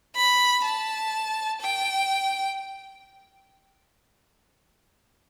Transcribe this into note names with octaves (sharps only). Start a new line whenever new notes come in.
B5
A5
G5